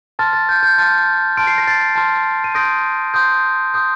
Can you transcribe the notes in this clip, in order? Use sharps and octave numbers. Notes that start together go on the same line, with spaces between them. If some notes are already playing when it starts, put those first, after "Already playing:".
A5 C6 F6 A6
A6
G6
G6
A5 C6 F6 A6
A5 C6 F6 D7
C7
A#6
A6 C7
A5 C6 F6
D#7
C6 D#6 G6 A#6 D7
C6 D#6 G6
C6 D#6 G6